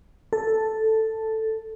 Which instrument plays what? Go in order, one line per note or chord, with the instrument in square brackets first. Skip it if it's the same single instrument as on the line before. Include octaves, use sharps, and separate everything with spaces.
[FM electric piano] A4